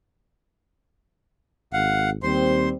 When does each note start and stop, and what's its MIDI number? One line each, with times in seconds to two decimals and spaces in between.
1.73 2.17 32
1.73 2.10 77
1.73 2.10 78
2.23 2.72 39
2.23 2.74 55
2.23 2.74 60
2.23 2.69 72
2.23 2.69 84